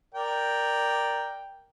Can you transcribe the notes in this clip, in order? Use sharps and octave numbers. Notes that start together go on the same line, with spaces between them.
A#4 D5 G5